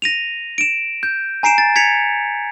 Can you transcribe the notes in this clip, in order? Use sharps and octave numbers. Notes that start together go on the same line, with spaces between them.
A#6 D#7 F7
D7 E7
G6
G#5 A#5 C7 D7 E7
A6
G#6 B6 C#7 F7